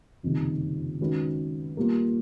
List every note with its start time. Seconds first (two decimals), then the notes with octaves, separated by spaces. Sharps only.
0.23 F#1 F2 C3 D#3 G3
1.00 D#3 G#3 C#4 F#4 B4
1.77 A#2 G3 A#3